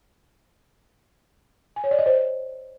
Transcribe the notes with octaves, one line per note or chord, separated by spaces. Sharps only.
G#5
C#5
D5
D#5
C5